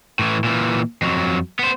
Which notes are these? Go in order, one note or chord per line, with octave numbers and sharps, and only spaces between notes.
A2 E3
A#2 E3
F2 F#3
B3 C5